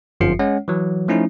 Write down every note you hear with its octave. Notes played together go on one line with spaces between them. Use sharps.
G1 F#2 F3 F4 C7 C#7
G#3 C#4 C#5 F#5
E3 F#3
F3 A3 C#4 D#4 E4